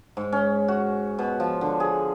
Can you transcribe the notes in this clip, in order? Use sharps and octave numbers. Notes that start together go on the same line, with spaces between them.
G#2
C#4
F#4
B2
F3
D3
G#4